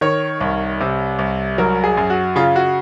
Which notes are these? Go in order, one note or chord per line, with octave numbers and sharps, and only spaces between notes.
D#3 C#5
C2
C3
C2
F#3 A#4
G#4
F#2
F#4
C#3 F4
F#4